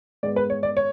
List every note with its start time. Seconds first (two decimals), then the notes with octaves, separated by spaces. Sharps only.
0.23 G#2 G#3 B3 D5
0.36 B4
0.50 C#5
0.63 D5
0.77 C#5